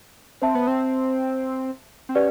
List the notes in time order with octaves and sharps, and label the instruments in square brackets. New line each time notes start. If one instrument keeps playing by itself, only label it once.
[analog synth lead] C4 [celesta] C5 E5 A5
[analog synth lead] B3
C4
C4
[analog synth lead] C#4 [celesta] G4 B4 D5 F#5